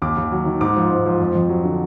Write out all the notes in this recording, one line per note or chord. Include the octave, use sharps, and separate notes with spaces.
D#2 D6
D#2
F#3
D#3
G#2 D6
F3
G#2
F3
F2
F2
F#3
D3